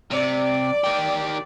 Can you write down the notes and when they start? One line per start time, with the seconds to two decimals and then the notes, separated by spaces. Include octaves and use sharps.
0.11 C3 D5
0.84 D#3 G4